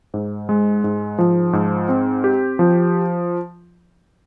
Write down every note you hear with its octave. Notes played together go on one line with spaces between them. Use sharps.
G#2
G#3
G#2
F3
G#2
C4
G4
F3